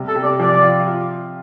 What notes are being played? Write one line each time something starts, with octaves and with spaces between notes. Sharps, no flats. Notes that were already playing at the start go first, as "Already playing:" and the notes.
Already playing: C3 G3
A4
C3
D5
F3 D5
F4
F4